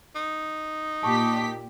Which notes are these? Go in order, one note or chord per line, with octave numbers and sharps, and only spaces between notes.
D#4
A#2 G4 A5 C#6 D6 B6